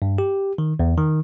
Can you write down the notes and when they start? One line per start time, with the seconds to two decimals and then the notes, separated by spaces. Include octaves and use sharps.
0.02 G2
0.18 G4
0.58 D#3
0.80 E2
0.98 D#3